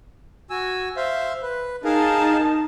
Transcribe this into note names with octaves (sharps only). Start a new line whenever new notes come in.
F#4 G#5 E6
C5 E5 F5
B4
D#4 G#4 A#4 F5 A5